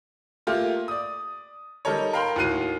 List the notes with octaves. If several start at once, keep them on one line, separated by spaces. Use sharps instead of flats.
A3 A#3 F4 G4
D5 D#6
G3 D#4 A4 A#4 C#5
A#4 F5 G5 B5 C6
D#2 A2 F#4 F#6 C7 D#7